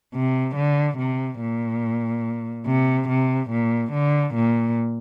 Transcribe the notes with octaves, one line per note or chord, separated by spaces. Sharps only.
C3
D3
C3
A#2
C3
C3
A#2
D3
A#2